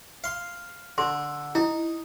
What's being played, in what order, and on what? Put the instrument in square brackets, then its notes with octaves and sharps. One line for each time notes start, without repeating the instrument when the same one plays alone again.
[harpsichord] F5 C6
[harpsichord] D3 [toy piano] C6
[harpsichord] D#4 [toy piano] E4